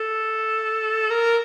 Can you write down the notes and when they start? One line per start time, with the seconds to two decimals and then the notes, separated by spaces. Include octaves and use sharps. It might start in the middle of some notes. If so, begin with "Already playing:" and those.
Already playing: A4
1.11 A#4